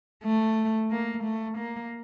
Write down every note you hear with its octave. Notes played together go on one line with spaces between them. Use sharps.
A3
A#3
A3
A#3